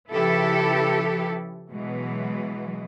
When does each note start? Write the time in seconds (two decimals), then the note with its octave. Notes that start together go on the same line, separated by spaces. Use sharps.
0.11 C#3 F3 E4 G4 A4 B4
1.72 B2 E3 F#3 G#3